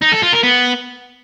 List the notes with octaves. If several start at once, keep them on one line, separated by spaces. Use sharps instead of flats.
D#4
A4
F4
A#4
B3